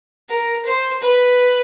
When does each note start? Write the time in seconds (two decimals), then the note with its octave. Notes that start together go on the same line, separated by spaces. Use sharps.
0.29 A#4
0.66 C5
1.03 B4